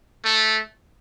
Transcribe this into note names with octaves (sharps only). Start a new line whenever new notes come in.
A3